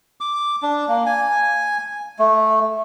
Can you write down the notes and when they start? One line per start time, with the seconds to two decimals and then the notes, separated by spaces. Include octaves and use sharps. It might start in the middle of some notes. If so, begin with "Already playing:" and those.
0.21 D6
0.62 D4
0.88 A#3
1.06 G#5
2.19 A3